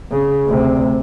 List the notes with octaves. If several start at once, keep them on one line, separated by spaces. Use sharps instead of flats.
C#3
D2 C3